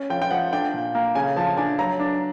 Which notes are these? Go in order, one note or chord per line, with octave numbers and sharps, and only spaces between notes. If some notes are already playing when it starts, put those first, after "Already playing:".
Already playing: C#4
F3 G5
G5
F3 F#5
D4 G5
A#2
A#3
C#3 G#5
F3 A5
D4 G#5
F#3 A#5
D4